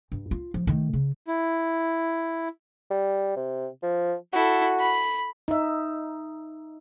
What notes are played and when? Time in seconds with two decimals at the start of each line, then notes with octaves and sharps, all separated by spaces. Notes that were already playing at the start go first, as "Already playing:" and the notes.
0.12 G2
0.31 F4
0.54 F3
0.67 D#3 A3
0.93 C#3
1.27 E4
2.91 G3
3.36 C3
3.83 F3
4.33 E4 F#4 A4
4.79 B5
5.48 D#4 E5